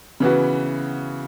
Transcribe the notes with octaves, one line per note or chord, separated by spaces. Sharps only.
C#3 E3 B3 F#4